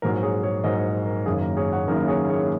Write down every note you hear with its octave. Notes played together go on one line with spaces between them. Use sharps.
A#1 G#2 F#3 A#4
G#4 C#5
G#4 C#5
A#1 G#2 F#3 A#4 D#5
A#4
F#1 F#2 D#3 A#3 G#4
A#4
G#4 C#5
C#5 F#5
F#1 F#2 D#3 A#3 A#4
G#4 C#5
G#4 C#5
C#5